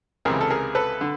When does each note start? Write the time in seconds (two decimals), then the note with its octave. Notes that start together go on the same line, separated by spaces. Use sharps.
0.25 C#2 C3 E3 G#4 A#4
0.41 A4
0.50 G#4 A#4
0.75 A4 B4
1.01 D3